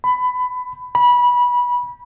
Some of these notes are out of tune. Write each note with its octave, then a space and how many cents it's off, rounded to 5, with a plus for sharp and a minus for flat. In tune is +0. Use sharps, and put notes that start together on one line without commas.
B5 +20
B5 -20